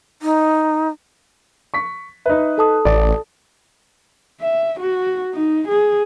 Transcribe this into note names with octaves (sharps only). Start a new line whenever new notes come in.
D#4
C#6 B6
D#4 B4 E5
A4 A5 D#6
A1 D5
E5
F#4
D#4
G#4